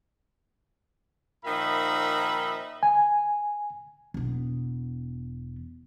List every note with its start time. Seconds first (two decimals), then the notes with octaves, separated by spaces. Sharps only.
1.46 A#2 D#3 F3 D#4 E5 B5
2.83 G#5
4.14 E1 B3